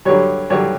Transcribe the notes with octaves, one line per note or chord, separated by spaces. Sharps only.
G2 D3 F#3 C#5
G2 D3 F#3 C#5